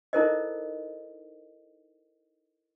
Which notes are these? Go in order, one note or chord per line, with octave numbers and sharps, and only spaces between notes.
D#4 E4 A4 A#4 C5 D#5